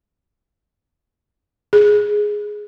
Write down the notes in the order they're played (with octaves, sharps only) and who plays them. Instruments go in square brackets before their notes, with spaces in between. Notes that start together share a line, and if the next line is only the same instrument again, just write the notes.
[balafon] G#4